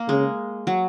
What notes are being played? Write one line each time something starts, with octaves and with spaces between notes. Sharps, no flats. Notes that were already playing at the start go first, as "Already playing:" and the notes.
Already playing: A#3
C#3 G#3
F#3